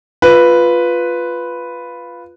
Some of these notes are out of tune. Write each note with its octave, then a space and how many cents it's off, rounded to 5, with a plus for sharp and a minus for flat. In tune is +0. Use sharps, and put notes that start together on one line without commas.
F4 +0 B4 +0